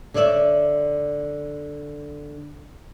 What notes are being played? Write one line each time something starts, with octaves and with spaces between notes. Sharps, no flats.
D3 C#5 D5 E5